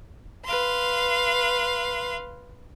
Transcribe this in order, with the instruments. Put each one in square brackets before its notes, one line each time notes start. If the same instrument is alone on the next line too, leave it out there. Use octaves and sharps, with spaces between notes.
[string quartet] B4 F5 C6